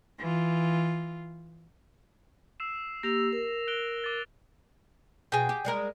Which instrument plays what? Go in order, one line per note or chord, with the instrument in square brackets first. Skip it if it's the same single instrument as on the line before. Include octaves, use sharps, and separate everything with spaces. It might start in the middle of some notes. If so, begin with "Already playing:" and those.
[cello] E3 F4
[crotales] E6 C7 E7
[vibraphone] A#3 G4 E6 [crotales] A#6 F7
[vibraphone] A#4
[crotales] F#6 D7 G7
D6 A6
[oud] B2 [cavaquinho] G#4 G5
[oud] G4
G3 G#3 A#4